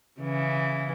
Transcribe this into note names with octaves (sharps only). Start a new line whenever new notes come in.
C#3 E3